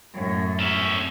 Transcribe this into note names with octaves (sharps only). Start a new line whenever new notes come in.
F#2 A2
C#4 E5